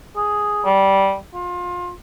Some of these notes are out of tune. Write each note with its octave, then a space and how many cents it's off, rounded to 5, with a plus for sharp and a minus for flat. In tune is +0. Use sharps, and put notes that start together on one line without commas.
G#4 +0
G3 -10
F4 +25